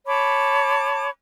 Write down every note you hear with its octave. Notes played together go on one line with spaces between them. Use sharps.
C#5 A5 B5 D6